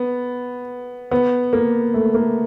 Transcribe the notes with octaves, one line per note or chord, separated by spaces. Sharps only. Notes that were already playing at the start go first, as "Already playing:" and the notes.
Already playing: B3
B3
A#3
A3
A#3